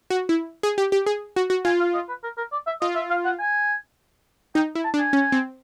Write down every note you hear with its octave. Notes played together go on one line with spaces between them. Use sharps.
F#4
E4
G#4
G4
G4
G#4
F#4
F#4
F4 G#5
F5
D#5
B4
A#4
A#4
D5
E5
F4 D#5
E5
F5
F#5
G#5
D#4 G5
E4
A5
D4
G#5
C#4
C4